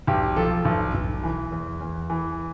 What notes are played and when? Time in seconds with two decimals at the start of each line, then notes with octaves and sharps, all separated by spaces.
0.07 B1 G4
0.36 F3 A4
0.65 B1
0.94 B1
1.23 E3
1.52 E2
1.81 E2
2.10 E3